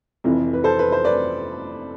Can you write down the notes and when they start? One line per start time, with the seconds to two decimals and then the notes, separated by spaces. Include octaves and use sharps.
0.24 F1 F2 E3
0.53 B4
0.64 A4 C5
0.79 B4
0.92 C5
1.05 B4 D5